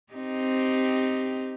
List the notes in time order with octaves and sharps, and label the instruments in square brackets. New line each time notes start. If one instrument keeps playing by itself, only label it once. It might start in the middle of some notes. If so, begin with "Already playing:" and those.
[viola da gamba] C4 D#4 G4